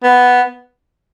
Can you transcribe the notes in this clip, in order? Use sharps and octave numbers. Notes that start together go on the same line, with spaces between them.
B3